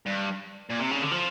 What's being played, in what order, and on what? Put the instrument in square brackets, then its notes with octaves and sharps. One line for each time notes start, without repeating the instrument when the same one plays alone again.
[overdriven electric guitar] G2
A#2
C3
C#3
D3
F3